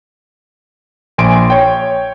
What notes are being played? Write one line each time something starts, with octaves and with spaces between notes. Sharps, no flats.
A#1 G#5 C6 D7
C#5 G5